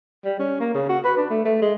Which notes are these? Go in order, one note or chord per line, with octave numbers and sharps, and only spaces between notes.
G3
C#4
A#3
C#3
F#4
B4
D4
A3
A3
G#3